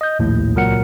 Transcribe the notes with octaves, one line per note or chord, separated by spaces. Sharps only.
D#5 G6
A#1 D#2 A2
C#2 A#2 F#3 A#4 F#5 C#7